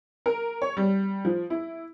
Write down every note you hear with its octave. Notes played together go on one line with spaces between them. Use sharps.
A#4
C#5
G3
F3
E4